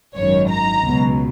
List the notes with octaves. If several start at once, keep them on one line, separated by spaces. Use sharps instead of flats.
G#1 F#2 D#3 C#5
A#5
C#2 B2 F#3